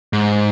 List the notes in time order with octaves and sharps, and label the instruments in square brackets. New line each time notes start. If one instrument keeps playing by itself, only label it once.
[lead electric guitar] G#2